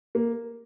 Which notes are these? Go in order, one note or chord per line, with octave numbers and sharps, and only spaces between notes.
A#3